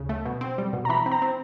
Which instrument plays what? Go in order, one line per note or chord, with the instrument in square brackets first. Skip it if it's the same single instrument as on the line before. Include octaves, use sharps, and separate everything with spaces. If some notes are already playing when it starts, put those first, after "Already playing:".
Already playing: [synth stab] D2 C#3
A3
B2
C4
G3
B2
[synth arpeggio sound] A#5
[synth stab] E3 [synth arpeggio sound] B5
[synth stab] C4
[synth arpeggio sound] A#5
[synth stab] C4